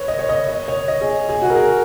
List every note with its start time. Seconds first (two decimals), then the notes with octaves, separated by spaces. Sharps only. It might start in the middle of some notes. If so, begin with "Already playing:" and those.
Already playing: B4 C#5
0.08 D#5
0.19 C#5
0.29 D#5
0.48 D#5
0.68 C#5
0.88 D#5
1.01 G#4
1.29 G#4
1.42 F#4
1.50 A#4
1.55 G#4